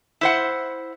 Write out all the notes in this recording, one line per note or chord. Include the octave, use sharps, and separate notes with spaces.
E4 C5 F#5